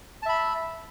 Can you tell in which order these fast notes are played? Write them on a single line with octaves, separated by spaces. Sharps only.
A5 E5 B5